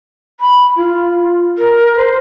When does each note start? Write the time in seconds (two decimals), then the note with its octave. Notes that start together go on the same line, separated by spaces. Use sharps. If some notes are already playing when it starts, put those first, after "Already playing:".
0.40 B5
0.76 F4
1.58 A#4
1.96 C5